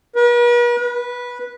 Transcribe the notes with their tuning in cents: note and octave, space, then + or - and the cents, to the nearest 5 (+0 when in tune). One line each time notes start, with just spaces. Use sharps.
B4 -45
B4 -15